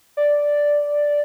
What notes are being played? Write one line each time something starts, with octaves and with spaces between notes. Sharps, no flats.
D5